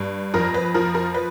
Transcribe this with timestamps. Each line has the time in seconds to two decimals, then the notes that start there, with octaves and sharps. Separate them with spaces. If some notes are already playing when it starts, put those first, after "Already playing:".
Already playing: G2
0.34 F2 A#4
0.54 B4
0.74 F3 A#4
0.95 A#4
1.14 B4